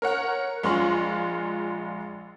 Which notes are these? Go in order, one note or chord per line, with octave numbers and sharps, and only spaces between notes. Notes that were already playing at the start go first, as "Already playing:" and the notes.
A#4 C#5 F#5
A#1 G#3 F4 C6 C#6 F#7